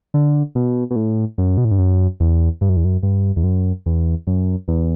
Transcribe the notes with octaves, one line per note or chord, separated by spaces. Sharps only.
D3
B2
B2
A2
F#2
B2
A2
G2
F#2
E2
G2
F#2
E2
F#2
G2
E2
F#2
E2
F#2
E2